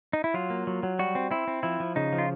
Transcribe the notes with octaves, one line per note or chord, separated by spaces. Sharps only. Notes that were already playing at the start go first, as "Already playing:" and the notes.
D#4
E4
F#3 F4
A#3
F#3
F#3
G3 F#4
C4
C4 E4
C4
F3 E4
F3
C#3 D#4
F3
F4